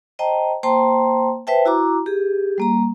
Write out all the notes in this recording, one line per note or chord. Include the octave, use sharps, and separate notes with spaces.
C5 D#5 G5 A5 A#5
A#3 C5 G5 A5 A#5 C6
B4 C5 E5 G5 A5
E4 F#4 A#5 D6
G4 G#4
G3 A#3 A#5